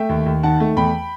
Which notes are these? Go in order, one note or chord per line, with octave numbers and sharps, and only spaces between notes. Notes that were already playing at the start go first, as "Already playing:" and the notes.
Already playing: A3 E5 G5
D#2
D#2
D#3 F#5 A5
A3
E2 G5 B5